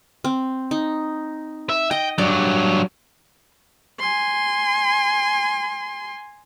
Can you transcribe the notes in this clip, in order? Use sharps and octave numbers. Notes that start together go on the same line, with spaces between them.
C4
D#4
E5
D#5 G5
G2 F#3 D5
G#5 C6